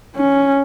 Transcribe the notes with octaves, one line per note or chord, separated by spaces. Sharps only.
C#4